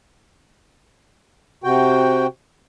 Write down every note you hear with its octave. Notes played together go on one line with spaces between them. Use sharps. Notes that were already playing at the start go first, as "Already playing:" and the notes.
C3 F#4 G5